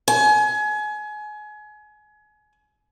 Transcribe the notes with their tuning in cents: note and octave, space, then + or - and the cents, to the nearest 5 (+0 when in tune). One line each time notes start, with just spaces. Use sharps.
G#5 +30